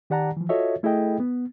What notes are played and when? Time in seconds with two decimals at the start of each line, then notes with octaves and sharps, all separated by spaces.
0.10 D#3 G4 D5 F#5 A5 A#5
0.37 E3 F3
0.49 F4 F#4 A4 C#5 D#5 E5
0.83 A3 E4 G#4 A4 D#5 G5
1.20 B3